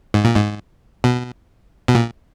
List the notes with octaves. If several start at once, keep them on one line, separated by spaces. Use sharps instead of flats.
G#2
A#2
G#2
B2
B2
A#2